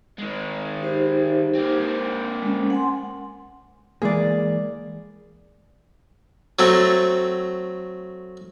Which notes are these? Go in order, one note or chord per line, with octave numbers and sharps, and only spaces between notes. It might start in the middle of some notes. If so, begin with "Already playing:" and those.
D#3 G#3
D#4 G4 C5
A#3 C4
G#3 C#4
F#5 G#5 C6
E3 G#3 A#3 G#4 D5
F#3 A3 C4